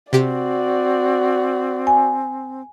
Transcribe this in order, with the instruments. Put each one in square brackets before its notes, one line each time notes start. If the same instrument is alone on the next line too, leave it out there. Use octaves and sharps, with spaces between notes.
[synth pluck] C3 G4 D7 [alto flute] C4 [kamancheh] F#4 D5
[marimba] G#5